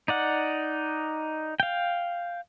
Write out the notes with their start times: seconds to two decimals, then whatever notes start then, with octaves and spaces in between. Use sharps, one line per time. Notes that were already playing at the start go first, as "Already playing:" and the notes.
0.08 D#4 D5 F#5
1.60 F5 G5